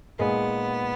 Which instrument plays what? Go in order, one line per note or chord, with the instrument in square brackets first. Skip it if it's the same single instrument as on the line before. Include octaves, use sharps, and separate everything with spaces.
[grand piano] A#2 G#3 D#4 G#4 [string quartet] B3